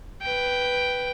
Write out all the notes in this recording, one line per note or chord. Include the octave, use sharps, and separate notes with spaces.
B4 G5